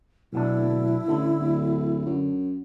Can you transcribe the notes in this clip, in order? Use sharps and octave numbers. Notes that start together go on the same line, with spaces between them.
B1 B2 D4 E4
D1
A1 D3
D1
F#2